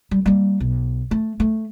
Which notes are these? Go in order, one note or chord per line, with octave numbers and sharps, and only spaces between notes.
G3
G3 A#3
B1
A3
A3